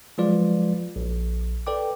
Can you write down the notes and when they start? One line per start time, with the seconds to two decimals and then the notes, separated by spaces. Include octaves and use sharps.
0.18 F3 F#3 G#3 F4 B4 D5
0.96 A#1
1.67 A4 B4 D5 G5 D6